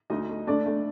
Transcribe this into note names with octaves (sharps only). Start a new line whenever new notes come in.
D2 D#4 D#5
A3
A3 D4 D5
A3